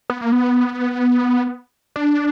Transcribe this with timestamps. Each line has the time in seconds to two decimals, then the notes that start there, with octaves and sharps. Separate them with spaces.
0.10 B3
0.21 A#3
0.32 B3
1.96 D4